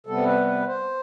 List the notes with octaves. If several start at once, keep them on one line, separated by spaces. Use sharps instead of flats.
C3 G3 B3 A4
B4
B4
C5